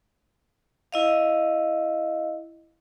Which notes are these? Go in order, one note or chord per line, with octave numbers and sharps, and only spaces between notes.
E4 D#5 F5